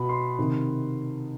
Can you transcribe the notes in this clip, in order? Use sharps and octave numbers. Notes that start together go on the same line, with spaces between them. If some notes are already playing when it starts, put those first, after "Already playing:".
Already playing: B2 B5
C6
C3 D#3